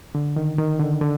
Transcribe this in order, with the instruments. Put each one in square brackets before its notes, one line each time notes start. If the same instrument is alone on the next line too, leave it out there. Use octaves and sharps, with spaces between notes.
[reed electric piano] D3
D#3
D#3
D3
D3